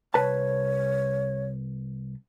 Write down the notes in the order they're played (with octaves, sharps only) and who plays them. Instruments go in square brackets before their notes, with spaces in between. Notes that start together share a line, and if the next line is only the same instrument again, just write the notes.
[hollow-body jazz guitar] C2 B4 A5 [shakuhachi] C#5